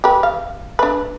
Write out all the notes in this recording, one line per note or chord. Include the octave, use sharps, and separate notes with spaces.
G4 B4
F5
D4 B4